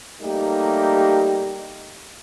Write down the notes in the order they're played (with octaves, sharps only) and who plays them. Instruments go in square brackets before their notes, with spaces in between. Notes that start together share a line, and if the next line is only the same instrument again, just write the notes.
[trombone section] G3 A3 A#3 D#4 G4